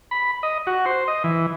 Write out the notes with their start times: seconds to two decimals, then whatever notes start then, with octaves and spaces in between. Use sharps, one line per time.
0.11 B5
0.43 D#5
0.67 F#4
0.86 C5
1.08 D#5
1.24 E3